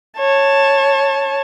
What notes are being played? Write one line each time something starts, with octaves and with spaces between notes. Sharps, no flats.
C#5 A5